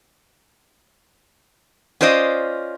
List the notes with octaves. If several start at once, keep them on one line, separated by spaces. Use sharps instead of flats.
C#4 F4 C5 D5 D#5